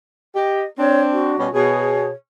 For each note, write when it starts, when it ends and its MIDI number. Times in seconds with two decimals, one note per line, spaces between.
0.35 0.62 67
0.35 0.66 75
0.78 1.34 60
0.78 1.34 62
0.78 1.01 73
1.12 1.51 66
1.38 1.49 47
1.38 1.49 55
1.38 1.49 61
1.54 2.10 47
1.54 2.10 68
1.54 2.10 73